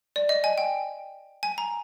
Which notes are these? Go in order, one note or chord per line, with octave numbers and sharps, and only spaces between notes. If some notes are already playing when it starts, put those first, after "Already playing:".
D5
D#5
G#5
G5
G#5
A#5